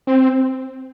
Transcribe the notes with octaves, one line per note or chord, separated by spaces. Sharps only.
C4